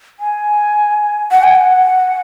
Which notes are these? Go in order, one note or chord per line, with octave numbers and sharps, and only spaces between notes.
G#5
F#5
G#5
F#5